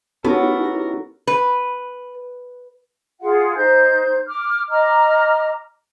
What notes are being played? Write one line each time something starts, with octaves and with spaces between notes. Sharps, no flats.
B3 C#4 D#4 E4 F#4 G4 A4 A#4
B4
F4 G#4 F5 F#5
D#4 C5 G6
D6 F6
D#5 A#5 D6 F6